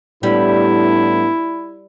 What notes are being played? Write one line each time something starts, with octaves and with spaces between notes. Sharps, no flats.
A2 G3 B3 D4 E4